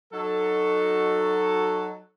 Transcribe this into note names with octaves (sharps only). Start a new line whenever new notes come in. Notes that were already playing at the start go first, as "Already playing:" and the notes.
F#3 D#4 F#4 A4